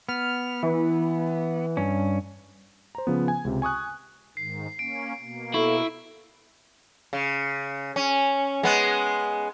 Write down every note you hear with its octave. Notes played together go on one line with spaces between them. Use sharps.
B3 F6
E3
G2 C#4
C5 A#5
C#3 F3 B3
G#5
C#2 C3
G#5 C#6 D#6 F#6
G#2 D#3 C7
A#3 C#4 D7
B2 A#3
E4 A4 C#6
C#3
C#4
G#3 B3